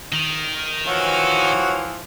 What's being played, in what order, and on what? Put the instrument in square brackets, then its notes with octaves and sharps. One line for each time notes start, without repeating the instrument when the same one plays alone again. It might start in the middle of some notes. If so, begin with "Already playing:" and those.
[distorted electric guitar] D#3
[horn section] E3 F3 [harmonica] F#4 C#5